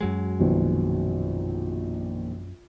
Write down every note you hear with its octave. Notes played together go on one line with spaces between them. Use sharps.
F#2 F#3 G#3
A#1 B2 D#3